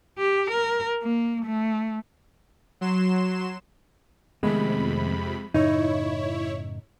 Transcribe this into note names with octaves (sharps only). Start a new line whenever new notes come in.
G4
A#4
A#3
A3
F#3 C6 E7
F2 C3 D#3 G#3 A3 B3 B5
F#2 A2 C#3 D#4 E4 C#5